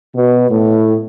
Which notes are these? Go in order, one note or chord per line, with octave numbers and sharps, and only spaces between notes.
B2
A2